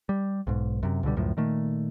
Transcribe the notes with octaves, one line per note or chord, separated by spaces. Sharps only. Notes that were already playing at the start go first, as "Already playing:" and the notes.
G3
B1 G#2
F#2 C3
C#2 B2 D3 G3
C#2 F#2 A2 F3
A#2 D#3 A3